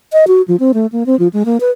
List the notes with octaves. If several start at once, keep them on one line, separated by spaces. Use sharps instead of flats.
D#5
F#4
F3
C4
A3
A#3
C4
F3
G#3
A#3
B4